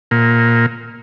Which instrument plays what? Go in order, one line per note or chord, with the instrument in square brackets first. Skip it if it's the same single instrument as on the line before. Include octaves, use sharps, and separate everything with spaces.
[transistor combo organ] A#2